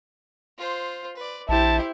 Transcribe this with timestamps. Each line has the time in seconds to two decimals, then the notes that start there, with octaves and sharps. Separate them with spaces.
0.58 F4 C5
1.17 B4 D5
1.49 A#1 E4 G4 C5 A5